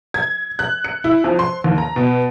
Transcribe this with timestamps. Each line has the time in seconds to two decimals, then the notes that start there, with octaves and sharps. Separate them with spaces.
0.14 G#6
0.59 F#6
0.84 C#7
1.04 E4
1.24 F2
1.39 C6
1.64 D#2
1.78 A#5
1.96 B2